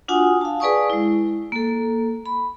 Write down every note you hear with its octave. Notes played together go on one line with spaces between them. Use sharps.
D4 F4 F#4 F#5 G#5 D#6
F5 A5
G#4 B4 D5 G#5 C#6 D#6
G#3 E4
A#3 A4
B5